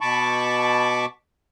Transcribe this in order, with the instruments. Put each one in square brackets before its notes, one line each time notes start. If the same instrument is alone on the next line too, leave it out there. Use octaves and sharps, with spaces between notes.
[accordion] B2 A5 B5 C#6 D6